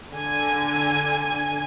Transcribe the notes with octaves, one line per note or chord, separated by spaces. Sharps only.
D3 G#5